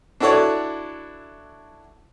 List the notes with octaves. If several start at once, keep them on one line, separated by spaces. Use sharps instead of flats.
D4 E4 F#4 A4 C#5 D5